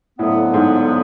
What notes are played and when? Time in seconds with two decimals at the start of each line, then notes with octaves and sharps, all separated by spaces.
0.19 F2 A2 D3 F#3 B3
0.54 G#2